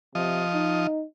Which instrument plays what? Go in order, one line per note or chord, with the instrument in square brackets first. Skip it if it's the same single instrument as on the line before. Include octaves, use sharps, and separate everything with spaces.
[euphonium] C3 [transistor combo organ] F3 D#5
[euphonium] D#4